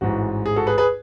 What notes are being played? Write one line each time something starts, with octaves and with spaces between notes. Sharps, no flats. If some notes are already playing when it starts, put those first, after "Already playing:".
A1 G#2 E3 F#4
G#4
F#4 A4
G#4 B4
G#4 B4